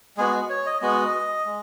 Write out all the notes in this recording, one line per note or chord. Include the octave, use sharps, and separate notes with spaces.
G#3 B3 F#4 G#4
C#5
D#5
G#3 B3 F#4 D#5
G#3